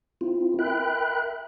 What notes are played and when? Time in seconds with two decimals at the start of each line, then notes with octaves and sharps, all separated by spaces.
0.21 C4 E4 F4
0.59 A#4 E5 G5 B5 F#6